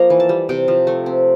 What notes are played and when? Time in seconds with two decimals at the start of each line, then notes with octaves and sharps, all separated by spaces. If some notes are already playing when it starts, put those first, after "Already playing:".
Already playing: F3 A#3 A#5
0.10 E3
0.20 A5
0.29 G3
0.49 C3 G5
0.68 F3
0.87 A3
1.06 C4